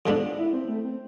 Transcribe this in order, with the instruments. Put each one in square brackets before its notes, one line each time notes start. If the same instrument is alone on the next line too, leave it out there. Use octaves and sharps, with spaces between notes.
[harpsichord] F2 E3 G#3 B3 D4 [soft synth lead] A4
[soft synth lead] E4
C4
A3
C4